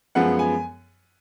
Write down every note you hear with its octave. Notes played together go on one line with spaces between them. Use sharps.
F#2 F3 G#3 B3 F#5
G#5